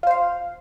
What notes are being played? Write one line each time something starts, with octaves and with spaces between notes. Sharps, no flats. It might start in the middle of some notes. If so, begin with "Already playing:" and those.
F4 C5 F5